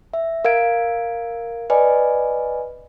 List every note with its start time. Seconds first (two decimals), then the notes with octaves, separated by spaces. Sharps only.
0.13 E5
0.45 A#4 F5 G#6 D7
1.70 B4 D5 D#5 G#5